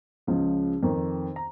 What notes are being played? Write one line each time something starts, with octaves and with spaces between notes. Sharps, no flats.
C#2 C#3 F3
F2 D#3
A#5